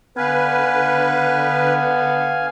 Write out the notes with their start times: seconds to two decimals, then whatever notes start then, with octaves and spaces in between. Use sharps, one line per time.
0.17 D3 B3 B4 F5 G#5